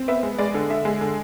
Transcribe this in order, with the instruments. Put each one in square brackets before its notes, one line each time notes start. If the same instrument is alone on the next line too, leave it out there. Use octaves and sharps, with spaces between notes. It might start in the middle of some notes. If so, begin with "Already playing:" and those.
Already playing: [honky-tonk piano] C4
B3 E5
G#3
G#3 D5
D3
D3 E5
G#3
D3